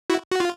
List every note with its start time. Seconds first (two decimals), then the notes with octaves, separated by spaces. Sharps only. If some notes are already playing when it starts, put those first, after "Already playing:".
0.10 E4 F#4
0.31 F#4
0.40 F4